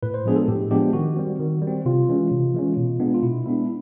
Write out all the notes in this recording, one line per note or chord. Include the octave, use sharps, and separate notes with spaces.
A2 B4
C5
F3 G#3 B3 D4 G#4
A4
A2 G4
F3 G#3 B3 D4 G4
D#3 F#4
G3 C4
D#3
G3
C4
C3 F4
E3 G#3 C#4
C3
E3 G#3 C#4
B2
G#3 B3 D4
F4
B2 E4
G#3 B3 D4 E4